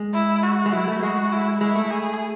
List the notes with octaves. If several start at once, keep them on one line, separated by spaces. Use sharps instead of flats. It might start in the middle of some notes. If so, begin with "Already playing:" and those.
Already playing: G#3
E4
F#4
G#3
F#3 E4
A3
G#3 F#4
E4
G#3 E4
A3
G#4